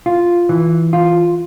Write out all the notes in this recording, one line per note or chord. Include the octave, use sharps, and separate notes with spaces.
F4
E3
F4